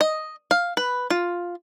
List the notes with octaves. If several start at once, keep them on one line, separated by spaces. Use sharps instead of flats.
D#5
F5
B4
F4